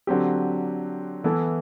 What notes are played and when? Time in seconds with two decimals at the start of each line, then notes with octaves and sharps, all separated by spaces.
0.07 D3 F#3 C4 G4
1.24 E3 B3 E4 A4